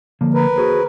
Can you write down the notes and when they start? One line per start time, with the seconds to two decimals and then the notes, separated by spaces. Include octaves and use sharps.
0.21 D3 F3 A#3
0.34 A#4 B4
0.56 F#4 G#4 C5